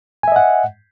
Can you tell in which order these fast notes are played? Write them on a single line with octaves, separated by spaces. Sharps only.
G#5 E5 D#5 F#5